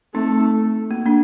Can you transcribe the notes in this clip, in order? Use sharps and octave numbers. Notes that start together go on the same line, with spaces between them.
A3 C4 D#4
A#3
A#3 D4